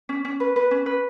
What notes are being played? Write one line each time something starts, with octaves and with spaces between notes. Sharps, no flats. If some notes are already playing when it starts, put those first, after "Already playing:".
C#4
C#4
B4
B4
C#4
B4